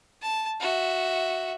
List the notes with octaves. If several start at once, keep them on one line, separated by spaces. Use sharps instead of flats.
A5
F#4 E5